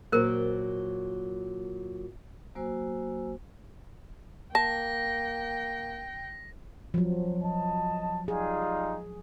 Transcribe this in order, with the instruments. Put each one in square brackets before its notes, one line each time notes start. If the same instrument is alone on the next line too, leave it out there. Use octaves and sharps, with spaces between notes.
[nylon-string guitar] A#2 F#3 [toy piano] A#4 C5
[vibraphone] F#3 A#3 F#4 C5 G#5 E6
[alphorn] A#3 [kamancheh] G5 [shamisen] A5 [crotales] A#6
[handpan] F3 F#3
[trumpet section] D#5 A5
[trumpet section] G3 D#4 F4 [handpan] G#4